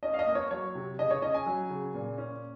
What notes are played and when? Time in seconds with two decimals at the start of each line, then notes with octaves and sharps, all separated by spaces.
0.03 C#4 D#5
0.14 F5
0.19 D#5
0.27 A#3
0.35 C#5
0.51 F#3 C#5
0.75 C3
0.99 C#3 D#5
1.11 C#5
1.22 C#4 D#5
1.34 G#5
1.46 F#3
1.70 C#3
1.94 A#2
2.18 C#4